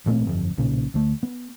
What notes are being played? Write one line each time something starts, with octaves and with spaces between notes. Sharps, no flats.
A1 A#2 A3 C4
G1 F2
B1 A#2 C#3
D2 A3
B3